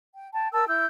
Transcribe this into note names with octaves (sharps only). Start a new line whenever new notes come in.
G5
G5 A5
A#4 G5 A5 E6
E4 E6 G6